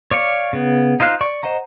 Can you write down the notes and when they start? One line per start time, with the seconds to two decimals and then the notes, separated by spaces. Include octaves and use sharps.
0.11 C#5 D5 F5 C#6
0.53 C#3 B3
1.00 D#4 F4 C5 F5 F#6
1.21 D5 C#6
1.43 C5 D#5 F#5 A#5